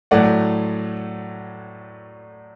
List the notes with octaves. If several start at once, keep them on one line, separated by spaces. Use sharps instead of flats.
A2 F#3 A3 D5 F#5